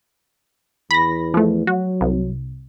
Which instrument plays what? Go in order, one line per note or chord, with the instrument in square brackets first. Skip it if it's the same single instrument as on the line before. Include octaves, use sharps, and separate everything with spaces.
[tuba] E2 [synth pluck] B5 A#6
[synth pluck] F3 A3
[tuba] F#3 [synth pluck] F#4
[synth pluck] C2